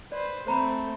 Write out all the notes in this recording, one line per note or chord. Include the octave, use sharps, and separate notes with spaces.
B4 C5 D5
A3 C4 C5 A#5 B5